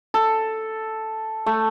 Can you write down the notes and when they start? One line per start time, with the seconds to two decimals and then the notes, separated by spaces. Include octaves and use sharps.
0.14 A4
1.46 A3